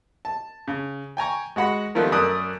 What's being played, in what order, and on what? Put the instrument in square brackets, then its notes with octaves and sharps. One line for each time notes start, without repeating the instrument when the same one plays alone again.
[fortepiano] A5
C#3
G5 G#5 A#5 C#6
G#3 F#4 F#5 B5
D#3 F3 G3 A3 B3
F#2 A3 A#4 D5 D#6 F#6